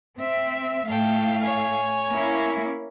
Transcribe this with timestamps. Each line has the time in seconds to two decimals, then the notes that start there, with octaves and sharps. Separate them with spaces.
0.17 C4 E5
0.87 A2 A3 A4 F5 G5
1.42 C#5 G#5
2.12 A#3 C#4 E4